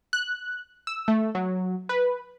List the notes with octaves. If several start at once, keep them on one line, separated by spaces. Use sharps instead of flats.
F#6
E6
A3
F#3
B4